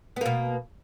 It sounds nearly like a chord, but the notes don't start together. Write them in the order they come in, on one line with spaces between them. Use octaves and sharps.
B3 A#3 B2